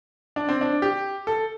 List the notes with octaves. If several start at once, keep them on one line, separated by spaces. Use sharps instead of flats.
D4
C4
D4
G4
A4